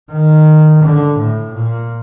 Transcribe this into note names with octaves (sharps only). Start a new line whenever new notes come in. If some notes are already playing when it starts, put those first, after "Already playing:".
D#3
D3
A2
A#2